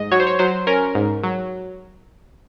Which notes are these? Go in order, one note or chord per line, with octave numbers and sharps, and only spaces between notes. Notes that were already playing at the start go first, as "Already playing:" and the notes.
Already playing: G#2 D#5
F#3 C#5
C5
C#5
F#3 C5
C#4 A#4
G#2
F#3